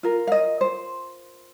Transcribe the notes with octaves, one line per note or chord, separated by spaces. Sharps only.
F4 A#4
F5
D#5
C5